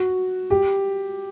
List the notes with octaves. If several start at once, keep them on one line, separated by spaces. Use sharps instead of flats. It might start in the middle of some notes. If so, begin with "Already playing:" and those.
Already playing: F#4
G4